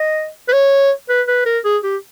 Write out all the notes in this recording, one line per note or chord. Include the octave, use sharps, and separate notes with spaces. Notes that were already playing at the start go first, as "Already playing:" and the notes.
Already playing: D#5
B4
C#5
B4
B4
A#4
G#4
G4